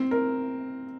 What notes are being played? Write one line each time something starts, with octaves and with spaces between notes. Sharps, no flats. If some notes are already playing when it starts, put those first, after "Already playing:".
Already playing: C4
A#4